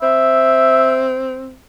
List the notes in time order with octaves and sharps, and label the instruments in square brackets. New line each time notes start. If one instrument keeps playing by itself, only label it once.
[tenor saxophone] C4 [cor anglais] E5